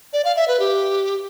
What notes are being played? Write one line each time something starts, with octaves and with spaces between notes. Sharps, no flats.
D5
F5
E5
B4
G4